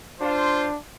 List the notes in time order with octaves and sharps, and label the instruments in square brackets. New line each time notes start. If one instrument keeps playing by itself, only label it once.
[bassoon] D4 [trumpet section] F4 C5